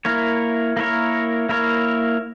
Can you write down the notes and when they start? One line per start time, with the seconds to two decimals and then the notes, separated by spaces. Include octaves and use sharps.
0.05 A#3 E4 A#4 C#5
0.77 A#3 E4 A#4 C#5
1.49 A#3 E4 A#4 C#5